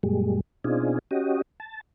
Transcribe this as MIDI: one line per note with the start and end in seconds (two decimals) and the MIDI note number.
0.03 0.40 42
0.03 0.40 46
0.03 0.40 55
0.03 0.40 56
0.64 0.99 47
0.64 0.99 60
0.64 0.99 62
0.64 0.99 63
0.64 0.99 65
0.64 0.99 68
1.11 1.42 61
1.11 1.42 66
1.11 1.42 67
1.11 1.42 75
1.60 1.81 81